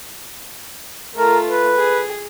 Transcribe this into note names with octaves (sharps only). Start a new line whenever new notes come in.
A3 F4 A#4
B4
G#4